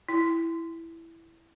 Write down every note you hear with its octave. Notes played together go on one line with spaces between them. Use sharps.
E4